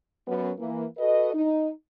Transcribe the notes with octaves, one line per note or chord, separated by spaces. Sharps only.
F#2 B3
E3 A#3
F#4 A4 B4 D#5
D#4